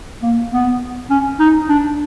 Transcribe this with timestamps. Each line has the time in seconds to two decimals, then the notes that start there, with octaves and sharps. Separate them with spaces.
0.22 A#3
0.51 B3
1.10 C#4
1.40 D#4
1.69 D4